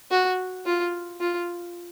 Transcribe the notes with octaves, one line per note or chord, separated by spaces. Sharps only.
F#4
F4
F4